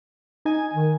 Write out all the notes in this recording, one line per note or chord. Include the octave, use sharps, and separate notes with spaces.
D#4 G#5
D#3